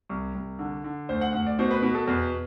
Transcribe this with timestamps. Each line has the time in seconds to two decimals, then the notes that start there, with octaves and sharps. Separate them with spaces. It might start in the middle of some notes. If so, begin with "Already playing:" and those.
0.09 C2
0.35 C2
0.59 D3
0.84 D3
1.09 D2 C5
1.21 F#5
1.33 D2 F#5
1.46 D5
1.59 B2 C5
1.71 B4
1.83 B2 B4
1.95 A4
2.07 E2 B4